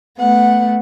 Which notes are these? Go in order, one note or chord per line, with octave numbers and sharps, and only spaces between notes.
A3 B3 F#5